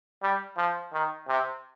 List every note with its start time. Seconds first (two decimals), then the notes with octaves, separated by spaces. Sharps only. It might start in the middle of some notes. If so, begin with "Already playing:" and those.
0.22 G3
0.57 F3
0.93 D#3
1.28 C3